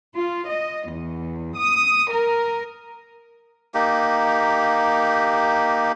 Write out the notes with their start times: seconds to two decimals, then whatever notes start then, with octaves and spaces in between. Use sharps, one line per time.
0.15 F4
0.47 D#5
0.89 E2
1.56 D#6
2.11 A#4
3.74 A#3 D#4 G4